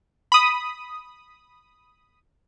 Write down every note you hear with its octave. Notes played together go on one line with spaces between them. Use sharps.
B5 D#6